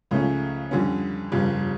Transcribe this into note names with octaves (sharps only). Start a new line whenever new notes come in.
C#2 C#3 F3 A3 C#4
F2 D3 G3 C#4
G1 F2 C#3 G3